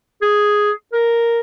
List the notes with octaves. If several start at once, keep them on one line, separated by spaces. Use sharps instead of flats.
G#4
A#4